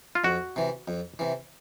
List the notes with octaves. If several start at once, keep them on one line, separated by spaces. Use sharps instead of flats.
F4
F2 F#4
C3 E3
F2
C3 E3